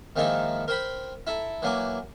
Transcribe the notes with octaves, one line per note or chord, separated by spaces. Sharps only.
D#3 F3 G#3 A#3 D#4 E4
A#4 C5 G5 B5
E4 A4 A#5
E3 F#3 A#3 G#5 D6